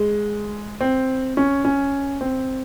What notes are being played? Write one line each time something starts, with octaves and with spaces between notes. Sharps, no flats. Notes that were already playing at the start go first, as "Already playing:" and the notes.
Already playing: G#3
C4
C#4
C#4
C4